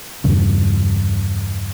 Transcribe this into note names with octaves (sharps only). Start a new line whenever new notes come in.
E2 G2 C#3